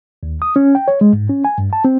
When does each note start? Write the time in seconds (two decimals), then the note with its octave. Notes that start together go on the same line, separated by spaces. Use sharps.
0.23 D#2
0.42 D#6
0.56 C#4
0.75 G5
0.88 C#5
1.01 G#3
1.13 G#2
1.29 C#4
1.45 G#5
1.58 G2
1.73 A5
1.85 C4